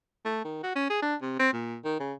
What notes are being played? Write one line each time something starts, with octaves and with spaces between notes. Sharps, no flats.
A3
D#3
F#4
C#4
G#4
D4
C3
C4
A#2
D#3
C#3